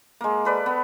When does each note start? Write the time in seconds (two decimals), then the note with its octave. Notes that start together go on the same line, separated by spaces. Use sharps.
0.21 G#3 A#3
0.45 A4 B4 D5
0.66 B3